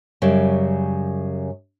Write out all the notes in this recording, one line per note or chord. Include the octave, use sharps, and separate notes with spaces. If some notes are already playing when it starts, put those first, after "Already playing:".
F#2 C#3 G3